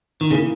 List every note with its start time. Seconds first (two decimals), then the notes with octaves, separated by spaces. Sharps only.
0.21 D#3
0.31 C#3 E3 A#3